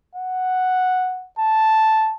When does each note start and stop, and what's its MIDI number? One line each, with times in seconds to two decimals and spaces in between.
0.15 1.27 78
1.39 2.16 81